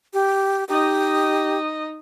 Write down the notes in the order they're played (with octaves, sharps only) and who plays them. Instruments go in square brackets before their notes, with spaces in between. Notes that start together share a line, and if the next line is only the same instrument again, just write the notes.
[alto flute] G4
[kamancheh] D#4 D#5 [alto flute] G4